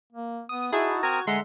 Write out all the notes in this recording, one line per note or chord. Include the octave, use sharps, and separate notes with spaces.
A#3
B3 D#6
D#4 E4 F#4 G#4 A5
C4 A#4 A#5 D#6 G#6
D3 G#3 E5 F#5 A#5 C6